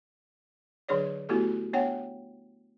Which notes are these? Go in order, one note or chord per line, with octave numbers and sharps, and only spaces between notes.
D3 F#3 D4 G#4 C#5 D5
A3 B3 E4 F#4 G4 A4
B3 D4 C#5 F#5 G5